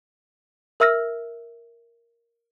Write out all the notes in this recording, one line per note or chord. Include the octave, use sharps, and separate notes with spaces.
A#4 E5 E6 F6 A#6